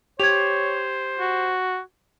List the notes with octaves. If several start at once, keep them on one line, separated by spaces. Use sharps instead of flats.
G4 C5 C#5 G#6 F7
F#4